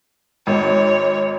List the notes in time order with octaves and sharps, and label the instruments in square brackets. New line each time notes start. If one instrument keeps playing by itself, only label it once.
[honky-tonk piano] G#1 [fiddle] C#5